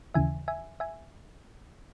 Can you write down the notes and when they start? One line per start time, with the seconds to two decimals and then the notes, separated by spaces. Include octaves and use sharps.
0.14 D#2 C#3 E3 E5 G#5
0.48 E5 G#5
0.80 E5 G#5